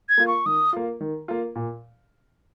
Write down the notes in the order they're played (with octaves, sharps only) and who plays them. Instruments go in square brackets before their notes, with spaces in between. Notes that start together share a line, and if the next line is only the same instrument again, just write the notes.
[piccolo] G#6
[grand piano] A#3 F4
[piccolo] C#6
[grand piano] D#3 [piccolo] D#6
[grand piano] A#3 F4
D#3
A#3 F4
A#2